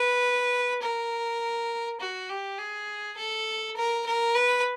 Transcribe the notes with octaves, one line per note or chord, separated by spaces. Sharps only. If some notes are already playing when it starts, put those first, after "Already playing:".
Already playing: B4
A#4
F#4
G4
G#4
A4
A#4
A#4
B4